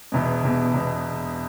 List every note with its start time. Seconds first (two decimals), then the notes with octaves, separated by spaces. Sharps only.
0.12 E1 E2 B2
0.43 E1 E2 B2
0.74 E1 E2 B2